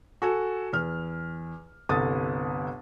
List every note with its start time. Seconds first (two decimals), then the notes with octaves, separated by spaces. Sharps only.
0.22 F#4 A4 G#5
0.73 E2 F6
1.89 G1 C2 A4 D#6 A6